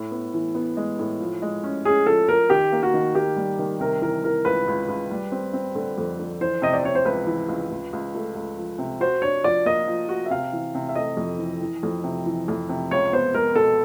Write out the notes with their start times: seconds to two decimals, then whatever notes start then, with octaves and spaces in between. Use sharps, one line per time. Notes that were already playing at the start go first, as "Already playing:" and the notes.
Already playing: A2
0.11 B3
0.34 E3
0.55 B3
0.77 G#3
0.99 A2
1.20 F3
1.42 G#3
1.63 C#4
1.85 C#4 G#4
2.06 F3 A4
2.28 F3 A#4
2.50 D#3 G4
2.73 A#3
2.83 F#4
2.94 D#3
3.15 A#3 G4
3.36 G3
3.59 D#3
3.80 C3 A#4
4.02 E3 A#4
4.23 E3 A#4
4.45 C#2 B4
4.68 C#2
4.88 C#2
5.11 G3
5.32 C4
5.53 C4
5.75 D3
5.98 F2
6.19 D3
6.41 E3 C5
6.62 C3 D#5
6.74 D5
6.84 C3 C#5
6.95 C5
7.05 C#2 B4
7.27 E3
7.48 C#2
7.70 C#2
7.93 C#2
8.15 A3
8.35 C#2
8.57 F3
8.78 C3
9.01 F#4 C5
9.22 D4 C#5
9.43 F3 D5
9.65 A#3 D#5
9.87 F3
10.09 F#4
10.26 E5
10.30 C3 F5
10.53 E3
10.75 C3
10.89 E5
10.95 A3 D#5
11.17 F2
11.39 E3
11.61 E3
11.83 F2
12.04 C3
12.26 E3
12.48 F2
12.69 C3
12.91 C#2 C#5
13.13 B3 C5
13.34 G#3 A#4
13.55 B2 A4